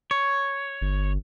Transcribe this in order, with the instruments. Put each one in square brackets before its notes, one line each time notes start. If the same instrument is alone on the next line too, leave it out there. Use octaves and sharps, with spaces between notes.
[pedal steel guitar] C#5
[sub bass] G1